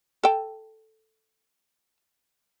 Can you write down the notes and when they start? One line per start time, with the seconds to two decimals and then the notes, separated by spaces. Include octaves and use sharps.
0.23 A4 G5